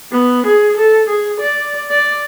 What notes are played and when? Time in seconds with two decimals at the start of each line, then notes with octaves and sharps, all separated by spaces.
0.12 B3
0.46 G#4
0.77 A4
1.09 G#4
1.40 D5
1.90 D5